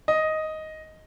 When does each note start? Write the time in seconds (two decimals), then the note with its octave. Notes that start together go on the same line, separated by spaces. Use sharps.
0.08 D#5